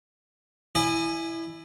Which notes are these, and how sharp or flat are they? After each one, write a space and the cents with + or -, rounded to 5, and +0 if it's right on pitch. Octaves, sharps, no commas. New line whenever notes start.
E4 +0 D#5 -45 G#5 +0